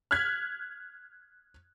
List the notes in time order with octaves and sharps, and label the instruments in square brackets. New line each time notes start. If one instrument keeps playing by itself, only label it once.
[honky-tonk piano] F6 F#6 G#6 B6